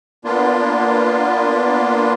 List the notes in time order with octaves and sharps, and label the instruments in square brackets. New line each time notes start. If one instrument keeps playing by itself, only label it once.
[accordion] A#3 B3 D4 F4